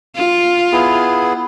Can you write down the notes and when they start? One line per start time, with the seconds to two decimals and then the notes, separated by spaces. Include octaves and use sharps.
0.16 F4
0.72 B3 E4 G#4